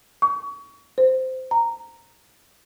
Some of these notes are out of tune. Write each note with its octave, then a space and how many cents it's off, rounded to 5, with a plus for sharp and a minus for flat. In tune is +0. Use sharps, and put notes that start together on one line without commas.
C#6 +30
C5 -15
A#5 -10